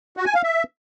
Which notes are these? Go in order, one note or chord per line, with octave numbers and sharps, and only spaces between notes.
F#4
G#5
F5
E5